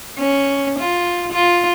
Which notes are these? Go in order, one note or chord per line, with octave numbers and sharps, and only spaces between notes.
C#4
F4
F4